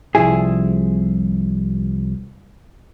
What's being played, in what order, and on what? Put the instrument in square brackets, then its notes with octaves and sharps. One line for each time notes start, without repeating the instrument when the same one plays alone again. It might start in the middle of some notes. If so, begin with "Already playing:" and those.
[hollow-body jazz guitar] C2 F3 E4 G#4